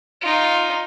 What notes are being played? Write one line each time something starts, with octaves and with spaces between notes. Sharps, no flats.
D#4 F4